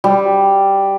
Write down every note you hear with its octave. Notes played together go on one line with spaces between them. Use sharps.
G3